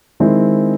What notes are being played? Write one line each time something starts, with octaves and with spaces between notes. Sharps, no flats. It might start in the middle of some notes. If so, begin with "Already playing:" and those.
D#3 G#3 C4 E4